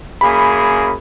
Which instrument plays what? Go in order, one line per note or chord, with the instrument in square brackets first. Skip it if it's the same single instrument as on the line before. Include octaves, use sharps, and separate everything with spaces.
[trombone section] F#2 A#3 G#4 [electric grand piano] B5